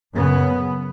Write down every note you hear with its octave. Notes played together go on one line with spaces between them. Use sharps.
F#2 C#3 B3